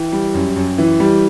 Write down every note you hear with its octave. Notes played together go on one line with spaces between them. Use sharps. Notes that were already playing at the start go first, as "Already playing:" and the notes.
Already playing: E3 G5
G3
F#2
F#2
E3
G3